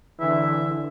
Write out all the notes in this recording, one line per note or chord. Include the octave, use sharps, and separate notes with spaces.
D3 E3 E5